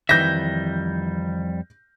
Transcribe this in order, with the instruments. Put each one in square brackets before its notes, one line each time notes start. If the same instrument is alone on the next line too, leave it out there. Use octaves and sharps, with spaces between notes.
[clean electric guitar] F2 G3 E5 [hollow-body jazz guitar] D#3 E3 [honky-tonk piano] G6 A#6